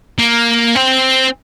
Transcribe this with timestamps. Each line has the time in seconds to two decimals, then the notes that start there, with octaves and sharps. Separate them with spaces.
0.19 A#3
0.75 C4